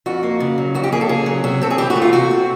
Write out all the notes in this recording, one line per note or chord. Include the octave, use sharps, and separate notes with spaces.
F2 F#4
A#3
C#3
F#3
F2 F#4
G4
A#3 G#4
A4
C#3 G#4
F#3
C3 F#4
C4 A4
G#4
E3 G4
F#4
A3
F4
C3 F#4
C4